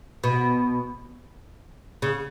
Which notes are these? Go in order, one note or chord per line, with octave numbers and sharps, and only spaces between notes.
B2
C#3